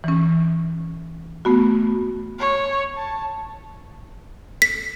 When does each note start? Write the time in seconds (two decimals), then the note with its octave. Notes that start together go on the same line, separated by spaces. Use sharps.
0.04 E3 C#4
1.45 A3 B3 F#4
2.39 C#5
2.96 A5
4.62 B6